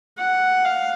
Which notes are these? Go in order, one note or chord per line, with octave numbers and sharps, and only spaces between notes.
F#5
F5